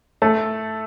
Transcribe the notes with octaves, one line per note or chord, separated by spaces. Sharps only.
A3 A4